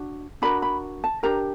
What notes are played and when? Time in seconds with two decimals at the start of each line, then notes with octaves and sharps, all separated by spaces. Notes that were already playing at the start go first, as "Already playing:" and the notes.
Already playing: D4 F#4
0.42 D4 F#4 A#4 B5
0.62 B5
1.04 A5
1.23 D4 G4 A#4 A#5